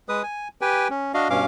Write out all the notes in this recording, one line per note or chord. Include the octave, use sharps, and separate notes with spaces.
G#3 B4 D#6
G#5
G4 B4 G5 G#5
C#4
D4 F#4 D#5 F5
G2 B2 C#4 F5 D6